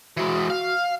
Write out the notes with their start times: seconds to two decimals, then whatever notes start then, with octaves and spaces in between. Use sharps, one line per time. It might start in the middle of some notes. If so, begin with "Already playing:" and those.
0.17 E3 G#3 F#4
0.50 F5